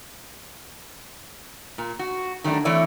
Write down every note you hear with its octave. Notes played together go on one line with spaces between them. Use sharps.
A#2
F#4
D#3 F#3 G3 A3 D4
E3 A3 C4 E4 C#5 D5